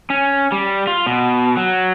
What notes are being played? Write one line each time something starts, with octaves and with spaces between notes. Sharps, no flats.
C#4
G3
F4
B2
F#3